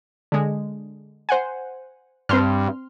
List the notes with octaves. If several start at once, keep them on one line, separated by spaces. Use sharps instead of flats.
D3 G#3
C5 F#5 G#5
G2 C4 C6 F6